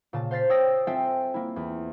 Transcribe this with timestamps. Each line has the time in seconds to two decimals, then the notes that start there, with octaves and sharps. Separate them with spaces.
0.13 A#2 C#3 A5
0.31 C5 F5 G6 A6 B6 C7
0.49 C#5 G5 D#6 E6 A#6
0.87 C4 F4 A4 E5 G5 G#5
1.34 A#3 E4
1.56 E2